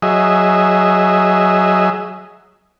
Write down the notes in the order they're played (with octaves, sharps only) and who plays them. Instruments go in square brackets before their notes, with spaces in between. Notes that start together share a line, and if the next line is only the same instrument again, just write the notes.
[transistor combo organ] F#3 G#4 D#5 E5